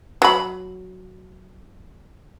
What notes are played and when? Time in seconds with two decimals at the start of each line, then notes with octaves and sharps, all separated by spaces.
0.22 F#3 B5